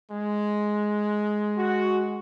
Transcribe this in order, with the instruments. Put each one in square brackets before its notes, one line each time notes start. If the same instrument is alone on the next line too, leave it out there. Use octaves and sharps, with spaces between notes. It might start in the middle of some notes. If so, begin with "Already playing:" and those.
[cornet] G#3
[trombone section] F#4